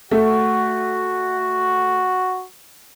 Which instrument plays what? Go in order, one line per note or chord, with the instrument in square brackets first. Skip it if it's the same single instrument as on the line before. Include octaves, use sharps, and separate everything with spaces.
[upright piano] A3 [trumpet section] F#4